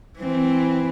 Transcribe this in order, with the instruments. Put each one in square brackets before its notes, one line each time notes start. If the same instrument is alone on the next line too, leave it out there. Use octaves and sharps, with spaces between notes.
[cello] E3 C4